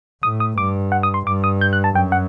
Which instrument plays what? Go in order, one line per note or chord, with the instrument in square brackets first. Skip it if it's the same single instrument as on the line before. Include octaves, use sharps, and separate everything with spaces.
[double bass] A2 [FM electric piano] D#6
[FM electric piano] D#6
[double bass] G2 [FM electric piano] D6
[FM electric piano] F#5
D#6
C6
[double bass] G2 [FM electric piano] D6
[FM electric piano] D#6
G6
F#6
A5
[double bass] F#2 [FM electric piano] G5
[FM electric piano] F#5